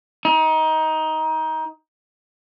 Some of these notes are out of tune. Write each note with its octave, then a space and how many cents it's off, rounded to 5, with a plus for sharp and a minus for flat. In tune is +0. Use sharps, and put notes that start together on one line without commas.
D#4 +20